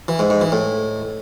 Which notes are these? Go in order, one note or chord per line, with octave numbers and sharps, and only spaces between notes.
E3
G#2
G#2
E3
A2